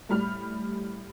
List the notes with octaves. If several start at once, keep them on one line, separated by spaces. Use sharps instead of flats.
A2 G3 B5 F6